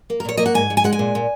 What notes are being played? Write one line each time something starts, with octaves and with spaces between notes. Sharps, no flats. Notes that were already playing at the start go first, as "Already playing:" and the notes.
A#3
A#4
A#2 C#5
A#3 D#5
F#5
G#2 G#5
G#2
G#5
G#3 F#5
G#5
A#2
A#2